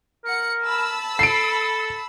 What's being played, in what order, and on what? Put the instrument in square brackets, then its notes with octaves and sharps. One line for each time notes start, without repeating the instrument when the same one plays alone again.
[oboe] A#4 [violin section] F#5 C#7
[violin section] A5 B5 E6
[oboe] A4 [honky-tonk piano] C7 D7